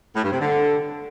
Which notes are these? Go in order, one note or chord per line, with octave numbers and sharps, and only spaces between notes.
A2
G2
C3
D3